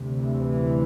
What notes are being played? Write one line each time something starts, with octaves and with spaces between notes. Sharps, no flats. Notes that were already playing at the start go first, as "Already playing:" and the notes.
Already playing: D2 C3
E3